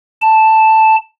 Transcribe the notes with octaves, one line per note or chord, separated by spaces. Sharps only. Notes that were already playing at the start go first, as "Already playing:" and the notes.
A5